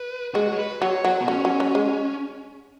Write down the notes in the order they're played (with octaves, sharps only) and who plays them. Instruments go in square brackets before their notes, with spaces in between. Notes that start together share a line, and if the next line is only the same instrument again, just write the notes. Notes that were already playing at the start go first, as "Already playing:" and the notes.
Already playing: [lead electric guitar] B4
[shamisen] G#3 [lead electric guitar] F#4
[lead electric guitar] C#5
B4
[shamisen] F#3 [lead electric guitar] C#5
[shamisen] F#3 [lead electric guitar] F#4
[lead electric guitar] B3
[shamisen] F#3 [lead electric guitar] C#4
[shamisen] F#3
F#3
G#3